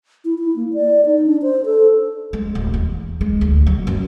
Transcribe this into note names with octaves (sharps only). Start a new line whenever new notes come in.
E4
E4
A#3
D5
D#4
D4
C5
A4
G#3
D1
E2
G#3
D2
F#3
F#2